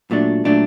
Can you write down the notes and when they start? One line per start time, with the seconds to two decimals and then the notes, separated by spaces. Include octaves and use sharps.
0.11 A#2 F#3 A3 D4
0.45 A#2 F#3 A3 D4